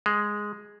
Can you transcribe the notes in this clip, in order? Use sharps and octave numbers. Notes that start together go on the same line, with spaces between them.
G#3